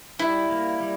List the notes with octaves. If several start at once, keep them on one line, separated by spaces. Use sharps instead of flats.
G3 E4
A#3
G3